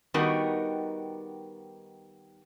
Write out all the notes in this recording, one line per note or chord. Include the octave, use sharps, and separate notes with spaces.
D#3 G3 B3 D#4 F#4 A#4